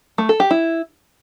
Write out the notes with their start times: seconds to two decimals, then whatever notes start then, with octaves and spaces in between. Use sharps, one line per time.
0.18 A3
0.29 A4
0.40 G4
0.51 E4